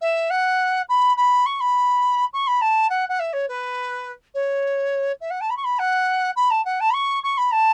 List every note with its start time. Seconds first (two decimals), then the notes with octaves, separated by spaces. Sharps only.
0.01 E5
0.30 F#5
0.89 B5
1.17 B5
1.46 C#6
1.60 B5
2.33 C#6
2.47 B5
2.61 A5
2.90 F#5
3.09 F#5
3.19 E5
3.33 C#5
3.48 B4
4.34 C#5
5.21 E5
5.30 F#5
5.41 A5
5.50 B5
5.57 C#6
5.64 B5
5.79 F#5
6.36 B5
6.50 A5
6.65 F#5
6.80 A5
6.90 B5
6.94 C#6
7.23 C#6
7.37 B5
7.52 A5